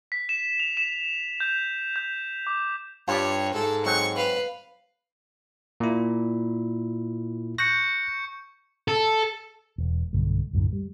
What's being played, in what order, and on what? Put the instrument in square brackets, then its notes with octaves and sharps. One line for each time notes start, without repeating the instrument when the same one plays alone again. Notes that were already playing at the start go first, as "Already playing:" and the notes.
[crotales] B6
E7
F7
E7
G6
G6
D6
[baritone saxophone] G2 [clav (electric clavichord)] F4 G4 [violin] C#5
[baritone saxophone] G#2 [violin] A4
[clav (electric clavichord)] F#3 G#3 C4 [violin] C#6
[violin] B4 F5
[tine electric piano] A#2 E4
[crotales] C#6 G6 C#7 [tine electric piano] F#6 A#6
[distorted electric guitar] A4
[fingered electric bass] E1
B1 G2 D3 A3
C2 F#2 A2 D3
G3